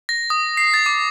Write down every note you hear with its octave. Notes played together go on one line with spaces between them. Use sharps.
A#6
D#6
C7
A6
D6